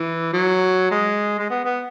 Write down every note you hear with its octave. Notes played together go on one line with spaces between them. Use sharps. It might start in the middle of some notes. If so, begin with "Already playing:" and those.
Already playing: E3
F#3
G#3
G#3
B3
B3